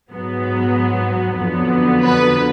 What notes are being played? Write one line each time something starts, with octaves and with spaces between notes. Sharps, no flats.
G#2 F#3 B3
F2 D3 F#3 B3
B4